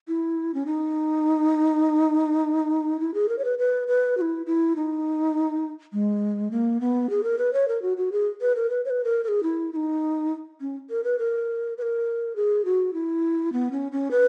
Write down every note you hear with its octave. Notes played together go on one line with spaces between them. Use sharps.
E4
C#4
D#4
E4
G#4
A#4
C#5
B4
B4
B4
F#4
E4
E4
D#4
G#3
A#3
B3
G#4
A#4
B4
C#5
A#4
F#4
F#4
G#4
B4
A#4
B4
C#5
B4
A#4
A#4
G#4
E4
E4
D#4
C#4
A#4
B4
A#4
B4
A#4
G#4
F#4
E4
B3
C#4
C#4
B4